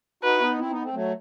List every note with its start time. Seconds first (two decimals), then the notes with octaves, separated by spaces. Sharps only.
0.23 D#4 F#4 B4
0.36 E4
0.41 B3 D#4
0.59 C4 E4
0.70 B3 D#4
0.82 A3 C4
0.94 F#3 A3